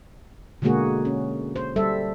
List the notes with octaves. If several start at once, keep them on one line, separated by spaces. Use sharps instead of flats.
B2 D3 G#3 A#3 F#4 G#4
C#4
C5
G3 A4 E5